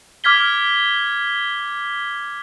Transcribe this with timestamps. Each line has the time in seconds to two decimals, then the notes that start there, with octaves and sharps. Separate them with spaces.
0.24 D6 F6 G#6 B6 G7